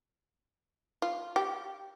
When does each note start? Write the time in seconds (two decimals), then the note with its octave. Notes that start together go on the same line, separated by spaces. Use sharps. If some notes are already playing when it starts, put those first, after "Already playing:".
1.02 F4
1.36 G4